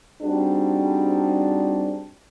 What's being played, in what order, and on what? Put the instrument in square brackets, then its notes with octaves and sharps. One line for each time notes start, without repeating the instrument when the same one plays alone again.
[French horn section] G3 C4 D4 D#4 F#4 G#4